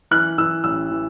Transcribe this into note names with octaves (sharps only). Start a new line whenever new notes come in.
E3 F#6
E3 E6
A1 E6
E3